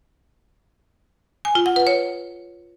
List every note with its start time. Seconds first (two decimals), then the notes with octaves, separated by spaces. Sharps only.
1.45 G#5
1.55 F4
1.66 F#5
1.76 B4
1.87 C#5